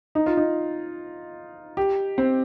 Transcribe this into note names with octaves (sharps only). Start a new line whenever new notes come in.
D#4
F4
D#4
G4
C4